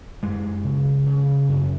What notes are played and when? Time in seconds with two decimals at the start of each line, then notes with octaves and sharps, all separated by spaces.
0.23 F#2 G#3
0.64 C#3
1.06 C#3
1.49 F#2